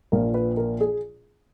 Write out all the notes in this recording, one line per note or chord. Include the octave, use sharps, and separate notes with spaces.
A#1 A#2 F3 A#4
B4
A#4
G#4